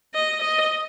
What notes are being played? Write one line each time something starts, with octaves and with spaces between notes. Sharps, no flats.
D#5
D#5